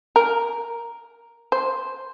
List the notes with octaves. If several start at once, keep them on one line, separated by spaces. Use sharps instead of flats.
A#4
C5